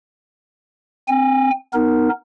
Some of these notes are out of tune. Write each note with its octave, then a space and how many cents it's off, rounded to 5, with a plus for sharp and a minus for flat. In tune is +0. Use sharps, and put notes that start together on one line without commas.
C4 +0 G#5 -30
B3 +0 D#4 +0 A#4 +0